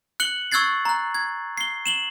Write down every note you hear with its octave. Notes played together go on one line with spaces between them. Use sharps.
F#6 C#7 F#7 G7
C#6 E6 F#6 G#6 A6 C7
A#5 F#6
G#6
C7 G7
E7 F#7 G7